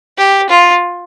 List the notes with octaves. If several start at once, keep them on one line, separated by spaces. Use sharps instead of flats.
G4
F4